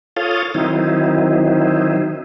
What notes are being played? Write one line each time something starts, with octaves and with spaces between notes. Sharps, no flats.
F4 A4 C#5 F5 D#6
D#3 F#3 C4 D#4 E4